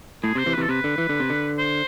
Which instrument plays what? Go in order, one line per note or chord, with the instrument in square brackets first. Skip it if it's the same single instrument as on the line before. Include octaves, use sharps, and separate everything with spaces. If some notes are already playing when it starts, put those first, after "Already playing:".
[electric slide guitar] A2 [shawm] G#4
[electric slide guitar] C3
[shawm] C5
[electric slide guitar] C3 E3
[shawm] B4
[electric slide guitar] C3 E3
[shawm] A4
[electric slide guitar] C3 [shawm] B4
[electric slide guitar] D3
E3
D3
C3
D3
[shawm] C5